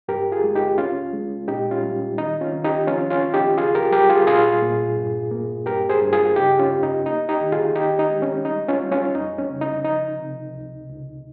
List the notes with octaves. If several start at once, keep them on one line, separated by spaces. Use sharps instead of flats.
G2 G4 A#4
F4 G#4
G#3
D#4 G4
C#2 C#4 F4
G#3
A#2 D#4 G4
C#4 F4
G3
D#3 D#4
C#4 F4
D#3
D#4 G4
F3 C#4 F4
C#4 F4
F3
D#4 G4
C#2 F4 G#4
G4 A#4
G3 G4 A#4
F4 G#4
A#2 F4 G#4
A#2
G2
A#3
G2 G4 A#4
G#4 C5
G2
F4 G#4
C#3 D#4 G4
C#4 F4
F2
D#4
A#3 D#4
D#4 G4
D#3
F4 G#4
D#3 D#4 G4
D#4
G#3
C#4
G3 D#4
C#4 F4
G3
C#4 F4
F2 D#4
C#4
C#3
D#4
F3 D#4
C3
C#2
C#2